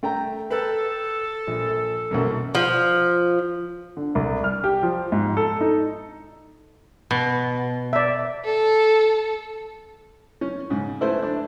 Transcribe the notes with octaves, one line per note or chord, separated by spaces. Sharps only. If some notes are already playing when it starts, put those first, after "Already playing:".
A3 G5 A#5
A4 B4 G5
A#1
B1 F#2 A#3
F3
D3
C2
F6
G4
F3
G#2
A4
D#4
B2
D5 E5
A4
C#4
G#2 C#3
A3 E4 B4 C5
D4